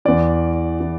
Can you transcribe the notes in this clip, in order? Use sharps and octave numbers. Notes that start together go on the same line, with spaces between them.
E2 E3 D5
E3